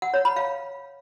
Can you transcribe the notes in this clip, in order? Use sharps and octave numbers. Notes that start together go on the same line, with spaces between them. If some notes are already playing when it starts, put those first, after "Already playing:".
F#5
C#5
B5
F5